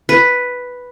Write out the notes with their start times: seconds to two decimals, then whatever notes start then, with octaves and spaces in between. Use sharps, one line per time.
0.09 B4